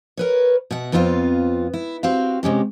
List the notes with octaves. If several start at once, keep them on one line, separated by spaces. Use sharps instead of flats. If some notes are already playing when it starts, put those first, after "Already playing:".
A#4 B4 C#5
B2 E5 F#5
F2 B3 C4 F4 G#4 F5
E4
C4 F#4 G4 F5
C3 G#3 C#4 G4